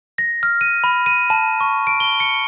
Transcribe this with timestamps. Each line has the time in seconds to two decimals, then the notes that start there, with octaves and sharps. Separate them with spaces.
0.18 A#6
0.43 F6
0.61 D#7
0.84 B5
1.06 D#7
1.30 A5
1.60 C#6
1.87 D7
2.00 G7
2.20 C#7